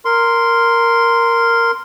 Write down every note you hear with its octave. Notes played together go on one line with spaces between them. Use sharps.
A#4 C6